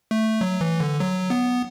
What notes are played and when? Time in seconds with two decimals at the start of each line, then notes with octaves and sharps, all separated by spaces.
0.11 A3
0.41 F#3
0.61 E3
0.80 D3
1.00 F#3
1.30 B3